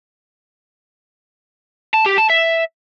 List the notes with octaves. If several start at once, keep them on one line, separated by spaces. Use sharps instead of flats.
A5
G4
A5
E5